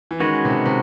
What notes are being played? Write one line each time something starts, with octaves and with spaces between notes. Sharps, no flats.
E3
D#3 G#3 C#4 F#4 B4
C3
B2
C3